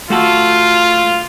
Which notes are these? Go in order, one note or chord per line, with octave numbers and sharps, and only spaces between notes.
A3 F4 F#4 A4